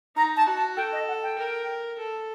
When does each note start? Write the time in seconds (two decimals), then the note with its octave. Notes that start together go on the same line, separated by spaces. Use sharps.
0.16 D#4 A#5
0.37 A5
0.47 F#4
0.57 A5
0.77 A4 G5
0.93 D#5
1.08 F#5
1.23 G5
1.38 A#4
1.99 A4